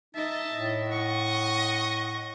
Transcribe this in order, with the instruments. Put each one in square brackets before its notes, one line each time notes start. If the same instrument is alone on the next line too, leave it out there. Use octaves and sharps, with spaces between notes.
[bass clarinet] D#4 [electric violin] D#5 E5 [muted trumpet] A5
[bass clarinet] A2
[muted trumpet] D#5 [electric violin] F#5 C#6